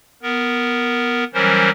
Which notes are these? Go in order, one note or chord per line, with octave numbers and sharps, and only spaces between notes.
B3 A#4
E3 F#3 G3 C#4 A#4 C5